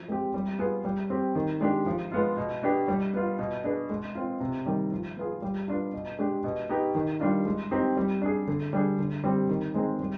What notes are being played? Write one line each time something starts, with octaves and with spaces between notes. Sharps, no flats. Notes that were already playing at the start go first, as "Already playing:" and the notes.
Already playing: F3
G#3 C4 G4
G3
B3 F4 G#4
G3
C4 G4
D#3
G#3 D4 G4
F3
G#3 B3 F4
B2
B3 D4 G4
G3
B3 F4
B2
B3 D4 G#4
G#3
C4 F4
C3
D#3 G3
F3
B3 F4 G#4
G3
B3 D4 F4
B2
G#3 D4 G4
B2
B3 D#4 G4
D#3
G3 D4 F4
G#3
C4 D#4 G4
G3
D4 G#4
D3
G3 D4 G#4
D3
G3 C4 G4
D#3
G#3 C4 D#4 G#4
G3